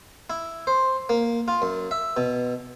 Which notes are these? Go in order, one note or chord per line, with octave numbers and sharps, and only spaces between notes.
E4
C5
A#3
F4
F#2
E5
B2